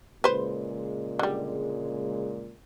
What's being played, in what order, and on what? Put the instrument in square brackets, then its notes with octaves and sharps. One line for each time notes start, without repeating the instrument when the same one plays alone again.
[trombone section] A#2 C#3 G#3 [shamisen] B4 C5
[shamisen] D3 G3